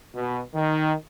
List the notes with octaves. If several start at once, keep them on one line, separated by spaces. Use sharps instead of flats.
B2
D#3